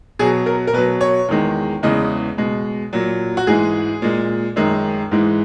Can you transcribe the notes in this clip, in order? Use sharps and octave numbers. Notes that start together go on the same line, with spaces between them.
B2 F#3 G#4
A#4
A#4
B2 F#3 B4
C#5
E2 D#3 G#3
E2 C#3 E3 G#3 D#5
B2 G#3
A#2 F#3
F#4
G#2 E3 G#3 G#4
A#2 G#3
F#2 D#3 G#3
G#2 E3 G#3